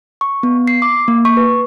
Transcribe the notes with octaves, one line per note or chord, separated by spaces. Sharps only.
C#6
B3
C7
D6
A#3
C#6
B4